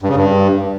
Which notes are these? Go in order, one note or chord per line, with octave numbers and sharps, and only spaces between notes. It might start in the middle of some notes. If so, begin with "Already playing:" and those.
G2
C#3
G2